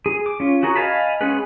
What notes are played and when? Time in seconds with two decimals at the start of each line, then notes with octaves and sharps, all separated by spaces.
0.06 G#4
0.26 D6
0.40 C#4 F4
0.63 F#4 G#4 A#4 C#5
0.76 D#5 F5 G#5 A5 B5
1.21 G#3 B3 C#4 G#4 B4